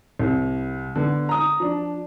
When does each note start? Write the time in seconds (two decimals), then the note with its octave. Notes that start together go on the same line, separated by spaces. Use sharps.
0.20 C2
0.95 D3 B3
1.29 A#5 D#6
1.60 F3 D4